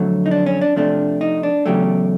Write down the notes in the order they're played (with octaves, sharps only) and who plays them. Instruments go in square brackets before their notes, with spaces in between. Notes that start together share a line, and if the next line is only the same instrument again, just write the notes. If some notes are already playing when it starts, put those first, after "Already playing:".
Already playing: [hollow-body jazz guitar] F2 D3 F#3 A3
D#4
D4
C#4
D4
C3 F3 A3 D4
D#4
D4
E2 C#3 F#3 A3 G4